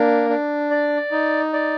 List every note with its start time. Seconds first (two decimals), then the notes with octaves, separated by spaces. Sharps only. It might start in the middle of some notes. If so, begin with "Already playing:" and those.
Already playing: A#3 D4
0.29 D4
0.71 D5
1.12 D#4
1.53 D5